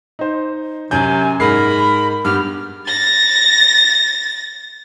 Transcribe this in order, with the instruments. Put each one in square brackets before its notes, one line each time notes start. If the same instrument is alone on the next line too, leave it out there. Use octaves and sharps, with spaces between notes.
[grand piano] D#4 C5
[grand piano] F#2 G6 [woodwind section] C3 F#3 [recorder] G#5
[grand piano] G#2 G#3 C7 [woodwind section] A#4 [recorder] B5
[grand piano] G2 [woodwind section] B3 D4 G4 [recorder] F6
[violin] A6 A#6